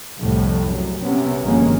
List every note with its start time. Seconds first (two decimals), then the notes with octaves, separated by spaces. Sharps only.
0.19 C2 F2 A2
0.65 F#2
1.03 C3 B3 C#4
1.44 G1 D#3 F3 G#3 A#3 C#4